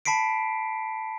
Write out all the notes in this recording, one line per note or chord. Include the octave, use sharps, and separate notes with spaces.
A5 B5 B6 C7 D7